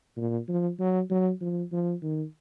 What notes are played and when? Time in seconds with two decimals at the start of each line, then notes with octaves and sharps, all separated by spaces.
0.17 A#2
0.49 F3
0.79 F#3
1.10 F#3
1.41 F3
1.72 F3
2.03 D#3